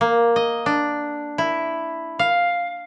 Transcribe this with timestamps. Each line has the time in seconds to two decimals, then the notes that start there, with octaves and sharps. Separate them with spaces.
0.01 A#3
0.36 D#5
0.66 D4
1.38 E4
2.19 F5